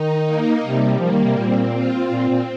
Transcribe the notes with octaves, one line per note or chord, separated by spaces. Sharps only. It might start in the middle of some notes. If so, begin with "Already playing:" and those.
Already playing: D#3 D#4
A#3
C3 G3
F3 A#3
D#3
C3
A#2 C4
F4
A#2 C4
A#2